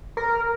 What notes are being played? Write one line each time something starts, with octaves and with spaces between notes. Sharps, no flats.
A#4